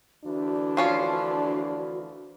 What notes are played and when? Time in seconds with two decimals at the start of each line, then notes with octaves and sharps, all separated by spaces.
0.24 D2 E3 D4 F#4
0.77 F3 C#4 F4